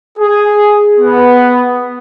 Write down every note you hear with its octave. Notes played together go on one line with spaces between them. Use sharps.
G#4
B3